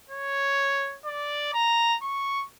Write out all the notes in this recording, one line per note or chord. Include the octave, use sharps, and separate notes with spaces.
C#5
D5
A#5
C#6